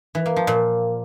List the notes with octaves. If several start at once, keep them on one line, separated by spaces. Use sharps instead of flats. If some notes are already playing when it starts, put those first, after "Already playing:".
E3
A#3
F3
A#2